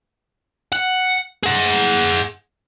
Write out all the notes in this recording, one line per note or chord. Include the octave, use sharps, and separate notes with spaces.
F#5
G#4 F#5